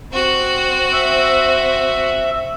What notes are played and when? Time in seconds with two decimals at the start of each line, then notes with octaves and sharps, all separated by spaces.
0.12 C4 F#4
0.93 E5